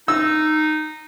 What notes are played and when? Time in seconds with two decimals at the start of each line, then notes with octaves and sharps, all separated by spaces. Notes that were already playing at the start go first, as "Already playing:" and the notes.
0.08 D#4 E6